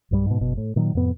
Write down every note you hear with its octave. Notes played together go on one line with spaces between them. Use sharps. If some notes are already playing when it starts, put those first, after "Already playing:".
B1 G2 D#3 G3
G#2 B2
F#1 B2
A2
A#2 D#3 F#3
F2 A2 C3 B3